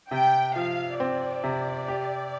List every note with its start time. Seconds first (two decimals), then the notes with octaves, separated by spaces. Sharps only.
0.11 C3 G5
0.56 F3 F5
1.00 C4 D5
1.44 C3
1.88 G4